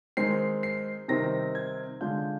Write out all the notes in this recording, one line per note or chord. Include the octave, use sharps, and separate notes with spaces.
D#3 G#3 C4 D#4 C7
C7
C3 D#3 G3 C4 D#4 A#6
G#6
D3 G#3 D4 F4 G6